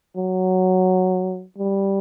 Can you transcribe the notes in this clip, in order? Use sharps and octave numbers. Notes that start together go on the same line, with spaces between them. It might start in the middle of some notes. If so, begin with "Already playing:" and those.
F#3
G3